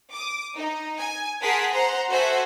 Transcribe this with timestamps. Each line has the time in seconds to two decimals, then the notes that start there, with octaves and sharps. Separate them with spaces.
0.12 D6 D#6
0.56 D#4
0.99 G#5
1.41 G#4 A#4 F#5 A5 C6 B6
1.71 C5 F#5 A#5 C6
2.08 F#4 A4 C5 E5 F#5 G#5